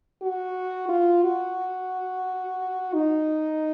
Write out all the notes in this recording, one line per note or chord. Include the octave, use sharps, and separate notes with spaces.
F#4
F4
F#4
D#4